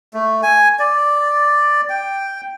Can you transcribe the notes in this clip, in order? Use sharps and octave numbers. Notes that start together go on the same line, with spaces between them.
A3
G#5
D5
G5